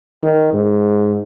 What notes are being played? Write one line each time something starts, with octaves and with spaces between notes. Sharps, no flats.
D#3
G#2